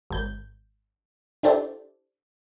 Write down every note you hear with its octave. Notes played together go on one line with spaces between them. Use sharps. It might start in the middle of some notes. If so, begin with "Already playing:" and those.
G#1 G6
D4 E4 G4 A4 C5 D5